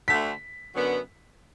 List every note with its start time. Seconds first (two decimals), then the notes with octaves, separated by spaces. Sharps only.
0.08 D2 D3 A3 B6
0.74 F#2 D3 F#3 B3